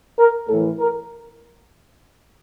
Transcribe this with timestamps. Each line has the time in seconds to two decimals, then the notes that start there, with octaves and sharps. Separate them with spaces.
0.19 A#4
0.48 A2 A4
0.53 E3
0.79 A#4